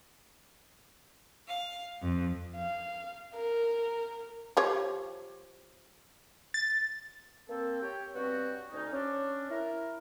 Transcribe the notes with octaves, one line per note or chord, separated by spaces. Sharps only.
F5
F2
F5
A#4
F3 G4 C#5
A6
A#3 C4 A4
G4 C#5 G5
G2 B3 C4 F#4 C#5 G5
D2 C#4 D#4
C#4 D4
E4 A#4